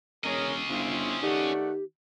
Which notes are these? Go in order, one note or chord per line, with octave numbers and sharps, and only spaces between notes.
E1 C#4 G#4 A#4 C#5 D#5
G1 C4 E4 F4
D#3 A3 G4 D5 F#5